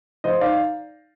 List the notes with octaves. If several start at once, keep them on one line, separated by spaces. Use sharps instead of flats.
F3 C5 D#5
D#4 D5 F5